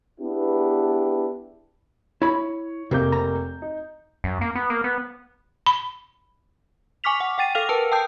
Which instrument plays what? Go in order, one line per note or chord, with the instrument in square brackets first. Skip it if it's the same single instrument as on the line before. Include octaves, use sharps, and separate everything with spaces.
[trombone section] B3 D4 E4 G4 G#4 B4
[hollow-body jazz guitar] E4 B5 [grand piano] C#5
[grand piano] F1 A#3 G6 [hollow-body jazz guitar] C3
[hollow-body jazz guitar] A#5
[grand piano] D#4
[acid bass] F#2
A#3
B3
A#3
B3
[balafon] B5
[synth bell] G#5 C#6 D6 F6 B6 F7
F#5
F#5 G5 A6 D#7
A4 F5 F6 F7
A#4 B4 A5 E6
G5 A5 D#6 G6